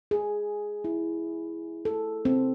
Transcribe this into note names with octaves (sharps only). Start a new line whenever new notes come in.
G#4
E4
A4
C4